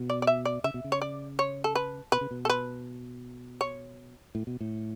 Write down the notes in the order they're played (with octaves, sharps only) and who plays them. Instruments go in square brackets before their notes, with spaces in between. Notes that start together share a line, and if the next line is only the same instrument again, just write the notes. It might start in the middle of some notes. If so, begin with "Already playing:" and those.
Already playing: [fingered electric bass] B2
[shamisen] D5
D5
E5
D5
[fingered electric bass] C#3 [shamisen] E5
[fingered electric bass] B2
C#3
[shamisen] C#5
D5
C#5
A4
B4
[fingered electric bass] B2 [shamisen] B4
[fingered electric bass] C#3
B2
[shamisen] A4
B4
C#5
[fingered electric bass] A2
B2
A2